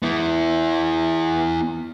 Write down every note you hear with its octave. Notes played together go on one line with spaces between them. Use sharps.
B3 E4